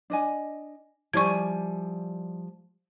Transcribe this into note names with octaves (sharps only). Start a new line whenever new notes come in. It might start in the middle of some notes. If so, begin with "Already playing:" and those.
D4 D#5 G#5
F3 G3 E4 D5 G#5 C#6 G#6